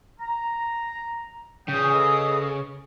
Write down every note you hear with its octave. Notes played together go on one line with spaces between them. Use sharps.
A#5
A#2 C#3 E3 G#4 G5 D#6
A4 B4 D#5